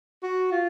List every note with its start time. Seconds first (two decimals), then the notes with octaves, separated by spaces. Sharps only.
0.22 F#4
0.52 F4